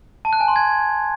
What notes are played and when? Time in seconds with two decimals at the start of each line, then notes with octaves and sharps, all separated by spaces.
0.25 A5
0.33 F#6
0.40 G#5
0.48 C6
0.56 G#6